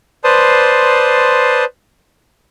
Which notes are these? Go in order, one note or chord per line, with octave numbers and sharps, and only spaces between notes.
B4 C5 D5 A5 C6 D#6